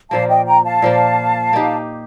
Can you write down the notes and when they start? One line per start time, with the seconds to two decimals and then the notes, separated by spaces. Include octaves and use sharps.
0.11 A#2 F3 A#3 F5 A5
0.29 D#5 G5
0.46 G5 A#5
0.64 F5 A5
0.82 A#2 F3 A#3
1.53 A#3 D#4 G4